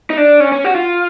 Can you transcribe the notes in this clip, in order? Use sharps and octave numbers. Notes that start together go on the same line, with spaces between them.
D#4
D4
C#4
C#4
F#4
F4